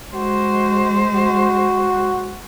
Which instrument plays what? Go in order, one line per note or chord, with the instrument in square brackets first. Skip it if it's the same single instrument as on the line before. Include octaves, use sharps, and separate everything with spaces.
[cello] G#3 C5 [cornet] F#4
[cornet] F#4